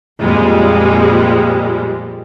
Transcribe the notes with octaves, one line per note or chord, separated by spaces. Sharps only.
F2 A#2 G3 G#3